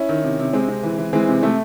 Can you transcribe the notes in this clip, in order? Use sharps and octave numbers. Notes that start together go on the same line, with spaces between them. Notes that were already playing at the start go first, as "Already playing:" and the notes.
Already playing: C#4 E4
D#3
C3
C3
C3 G#3 C4
C3
E3
E3
E3 G#3 C4
C3
C3 A3